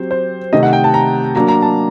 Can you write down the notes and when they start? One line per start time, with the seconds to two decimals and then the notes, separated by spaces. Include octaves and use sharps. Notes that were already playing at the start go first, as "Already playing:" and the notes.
Already playing: F#3 C4 G4 C5
0.11 C5
0.53 C3 D#3 A3 D#4 D#5
0.63 F#5
0.73 G5
0.84 A5
0.94 A#5
1.35 F#3 A#3 D4 A#5
1.48 A#5
1.62 A5